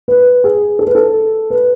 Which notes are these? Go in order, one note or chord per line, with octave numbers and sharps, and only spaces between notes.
B4
G#4
A4
B4
A4
B4